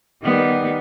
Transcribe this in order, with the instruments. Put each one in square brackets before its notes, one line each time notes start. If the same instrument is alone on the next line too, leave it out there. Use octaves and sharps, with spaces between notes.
[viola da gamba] D#3 G3 B3